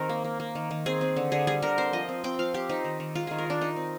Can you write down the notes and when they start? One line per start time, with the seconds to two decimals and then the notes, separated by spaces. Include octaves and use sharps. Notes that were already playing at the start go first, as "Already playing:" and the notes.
Already playing: D#3 C4 G4 A#4
0.09 A#3
0.24 A#3
0.40 A#3
0.55 D#3
0.71 D#3
0.86 C4 G#4
1.01 C4
1.16 D3
1.32 D3 G#4
1.47 G3 G#4
1.62 D3 A#4
1.78 C4 C5
1.93 F3 D#5
2.09 C4
2.24 C4 G5
2.39 F3 F5
2.54 C4 G4
2.69 C4 D#4
2.84 D#3
3.00 D#3
3.15 G#3 F4
3.27 D#3 G#4
3.38 A#4
3.46 D#3 D4
3.61 D#3 D#4
3.76 C4